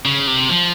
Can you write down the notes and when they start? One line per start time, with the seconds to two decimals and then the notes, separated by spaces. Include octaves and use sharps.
0.05 C#3
0.27 C3
0.49 F3